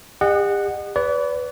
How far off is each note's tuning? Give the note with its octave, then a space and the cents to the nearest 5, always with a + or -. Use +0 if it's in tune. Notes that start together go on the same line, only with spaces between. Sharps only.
G4 +45 D#5 -35 F#5 +0
B4 +10 D5 -35